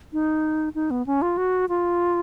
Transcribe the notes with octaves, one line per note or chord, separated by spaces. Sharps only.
D#4
D#4
B3
C#4
F4
F#4
F4